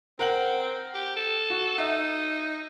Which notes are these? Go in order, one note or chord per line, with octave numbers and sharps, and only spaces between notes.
C4 A#4 F#5 F#7
G4
A4
F#4
D#4 E5